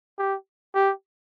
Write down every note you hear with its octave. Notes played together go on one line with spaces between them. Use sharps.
G4
G4